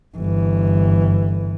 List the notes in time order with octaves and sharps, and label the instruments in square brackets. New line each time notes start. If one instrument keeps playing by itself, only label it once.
[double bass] G1 E3